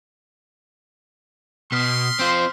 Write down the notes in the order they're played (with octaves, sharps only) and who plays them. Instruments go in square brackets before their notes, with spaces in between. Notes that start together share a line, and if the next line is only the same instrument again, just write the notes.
[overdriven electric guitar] B2 [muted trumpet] C6 [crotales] D#6 F6 B6
[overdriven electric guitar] C4 F4 [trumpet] C5